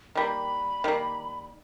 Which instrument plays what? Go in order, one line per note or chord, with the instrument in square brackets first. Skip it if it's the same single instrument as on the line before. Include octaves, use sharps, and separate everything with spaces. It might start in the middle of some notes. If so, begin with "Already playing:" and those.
[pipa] D#3 G3 A#3 [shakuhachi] B5
[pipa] D#3 G3 A#3